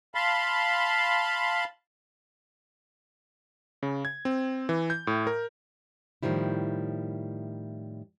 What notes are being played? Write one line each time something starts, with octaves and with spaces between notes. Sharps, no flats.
F5 A5 B5 C6
C#3
G#6
C4
E3
G6
A2
A#4
A2 D#3 F3 G3 E4